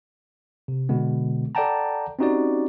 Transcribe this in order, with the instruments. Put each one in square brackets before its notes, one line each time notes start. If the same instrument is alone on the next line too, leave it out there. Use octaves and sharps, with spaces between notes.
[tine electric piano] C3
B2 D3 G#3 B3
A4 D5 F#5 G5 A5 A#5
C4 C#4 D#4 F#4 G4 D5